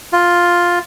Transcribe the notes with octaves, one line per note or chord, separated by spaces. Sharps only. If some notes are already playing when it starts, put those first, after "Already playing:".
F4